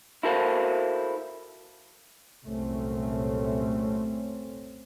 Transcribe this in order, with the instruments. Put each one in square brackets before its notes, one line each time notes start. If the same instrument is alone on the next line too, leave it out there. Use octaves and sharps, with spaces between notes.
[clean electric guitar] E4 F#4 A4 A#4 C5 F5
[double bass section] C2 F#2 A#2 A3 C4 C#4